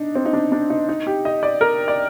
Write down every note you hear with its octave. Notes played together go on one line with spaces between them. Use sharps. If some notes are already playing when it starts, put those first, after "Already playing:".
Already playing: D4 D#4
C4
D#4
D4
D4
D#4
D#4
G4
D#5
D5
A#4
D5